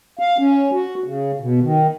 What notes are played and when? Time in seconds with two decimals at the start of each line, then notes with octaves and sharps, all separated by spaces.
0.19 F5
0.38 C#4
0.72 F#4
1.04 C#3
1.40 B2
1.62 D#3